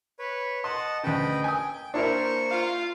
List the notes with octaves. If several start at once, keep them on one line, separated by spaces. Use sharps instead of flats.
B4 C#5
D#5 F#5 A5 C6
D2 C#3 B4 D#5 G5
G5 G#5 D#6
A#3 D4 E4 A#4 C5 C#6
F4 F5